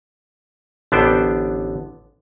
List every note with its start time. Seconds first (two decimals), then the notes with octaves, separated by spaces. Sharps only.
0.92 A1 D3 B3 D4 C5 G5